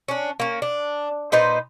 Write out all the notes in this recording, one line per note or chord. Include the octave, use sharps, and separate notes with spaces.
C#4 D4
A#3 C#4
D4
A#2 D#4 B4 C5